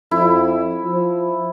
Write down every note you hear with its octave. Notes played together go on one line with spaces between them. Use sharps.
F2 E4
F3